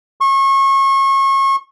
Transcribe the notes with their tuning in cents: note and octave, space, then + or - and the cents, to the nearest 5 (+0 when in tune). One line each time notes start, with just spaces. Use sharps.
C#6 -30